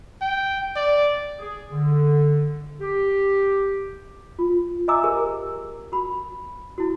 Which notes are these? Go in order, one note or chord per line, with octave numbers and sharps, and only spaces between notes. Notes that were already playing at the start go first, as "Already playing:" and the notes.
G5
D5
G#4
D3
G4
F4
D#5 E5 G#5 A#5 D6 E6
G4 G#4 A#4 C5
F#4 B5
E4 F#4